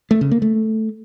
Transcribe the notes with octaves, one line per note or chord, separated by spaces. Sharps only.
A3
C#3
A#3
A3